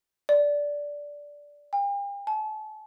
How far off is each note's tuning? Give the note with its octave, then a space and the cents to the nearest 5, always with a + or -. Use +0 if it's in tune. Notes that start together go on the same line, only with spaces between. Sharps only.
D5 -10
G5 +45
A5 -35